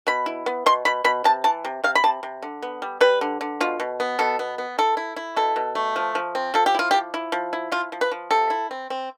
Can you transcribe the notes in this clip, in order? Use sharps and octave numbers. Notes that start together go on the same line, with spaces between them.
B2 B5
E4
B3
B2 C6
B2 B5
B2 B5
C3 A5
E3 A5
C3
C3 F5
B5
C3 A5
C3
D3
B3
G3
G3 B4
D3
D3
B2 F4
B2
B3
B2 A4
B3
B3
E4 A4
E4
E4
B2 A4
B2
A3
F3
F3
C4
F3 A4
G4
E4 F4
G4
F3
E4
F3
E4
F3 F4
F3
B4
F3
C3 A4
E4
C4
C4